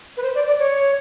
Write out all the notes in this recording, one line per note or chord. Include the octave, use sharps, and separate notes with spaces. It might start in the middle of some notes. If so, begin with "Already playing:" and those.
B4
C5
D5
D5
C#5